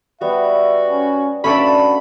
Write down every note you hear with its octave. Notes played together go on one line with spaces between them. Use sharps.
G3 B3 F#4 E5
C#4
A3 C#4 D4 F#4 A4 D5 F5 B5